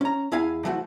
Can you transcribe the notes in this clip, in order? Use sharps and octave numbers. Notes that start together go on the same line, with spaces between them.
C#4 A#5
E2 E4 F5 G#5
E3 F3 A3 F#4